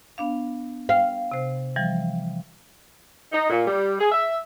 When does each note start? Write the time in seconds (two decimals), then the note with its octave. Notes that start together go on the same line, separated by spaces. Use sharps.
0.18 B3 D4 F5
0.89 F5 G5
1.32 C3 C5
1.76 E3 F3 G3
3.32 D#4
3.50 A#2
3.67 G3
4.00 G#4
4.12 E5